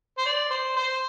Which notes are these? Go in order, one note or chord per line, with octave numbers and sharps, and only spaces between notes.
C5
D5
C5
C5